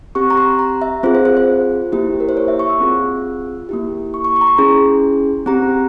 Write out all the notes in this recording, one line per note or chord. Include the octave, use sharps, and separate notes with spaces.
C4 G4 C#6
A#5
C6
A#5
E5
C4 F4 G#4 C5
C5
C5
C5
A#3 E4 G4
A#4
C5
C#5
E5
C#6
E6
C4 F4 G#4
A#3 E4 G4
C#6
C#6
C#6
A#5
C6
C#4 E4 G#4
C4 G4 A#5